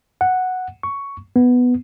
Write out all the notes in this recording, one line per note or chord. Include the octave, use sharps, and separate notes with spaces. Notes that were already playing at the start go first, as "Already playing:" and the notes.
F#5
C#6
B3